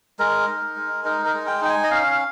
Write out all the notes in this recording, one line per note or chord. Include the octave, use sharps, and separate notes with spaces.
G#3 A#4
D#4
G#3
D#4 A#4
A#4
G#3
G5
D#4 G5
G#5
D#5
C#4 F5